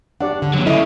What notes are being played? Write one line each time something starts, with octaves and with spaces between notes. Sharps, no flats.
D4 G4 D5 F#5
D3
A#2 C#3 F#3
C#3 E4 A4 D#5 E5